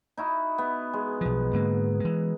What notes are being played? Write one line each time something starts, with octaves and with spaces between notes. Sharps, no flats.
D#4 E4 F#4
B3
G#3
B1 F3
G#2 D3 A#3
E3 G#3